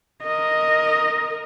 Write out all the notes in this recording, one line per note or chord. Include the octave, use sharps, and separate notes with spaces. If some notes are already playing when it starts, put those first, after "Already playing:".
A#4 D#5